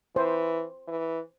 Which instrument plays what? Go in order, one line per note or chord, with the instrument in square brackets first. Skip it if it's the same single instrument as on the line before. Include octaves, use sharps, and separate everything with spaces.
[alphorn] E3 [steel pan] C5
[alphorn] E3